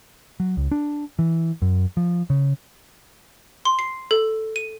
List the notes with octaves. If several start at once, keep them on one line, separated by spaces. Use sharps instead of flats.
F#3
C#2
D4
E3
F#2
F3
C#3
C6
C7
A4
D#7